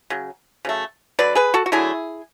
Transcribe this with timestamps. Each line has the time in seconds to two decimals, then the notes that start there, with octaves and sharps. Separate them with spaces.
0.10 C#3 F#3
0.65 C#3 F#3 A3
1.19 D3 F#3 B4 D5
1.35 G#4 B4
1.54 F#4 A4
1.66 F#4
1.72 D3 F#3 A3 E4 G#4